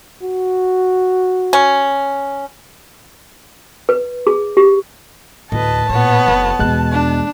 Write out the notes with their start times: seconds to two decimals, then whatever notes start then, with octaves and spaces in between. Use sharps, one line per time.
0.23 F#4
1.53 C#4
3.89 B4
4.27 G#4
4.57 G4
5.52 D2 A2 B4 D#5 A5
5.89 A#2 B3 C#5
6.27 F1
6.59 E2 B2 G#3 F#6
6.92 D4